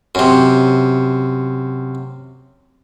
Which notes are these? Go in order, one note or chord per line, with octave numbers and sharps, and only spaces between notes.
F#2 C3